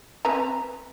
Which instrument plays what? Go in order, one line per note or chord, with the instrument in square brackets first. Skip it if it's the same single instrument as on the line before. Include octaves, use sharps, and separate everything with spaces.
[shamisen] C4 B4 A#5